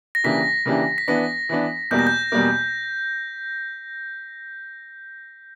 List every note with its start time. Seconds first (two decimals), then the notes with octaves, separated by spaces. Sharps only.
0.15 A#6
0.24 C#3 E3 A#3 D4 G4 B6
0.65 C#3 E3 A#3 D4 G4
0.98 B6
1.08 E3 B3 D4 A#6
1.49 E3 B3 D4
1.91 E2 B2 G3 A#3 G6
1.99 A#6
2.07 G6
2.32 E2 B2 G3 A#3